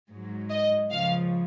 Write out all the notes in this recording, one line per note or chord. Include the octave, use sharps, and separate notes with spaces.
G#2 F#3
D#5
C#2 C#3 F3 F5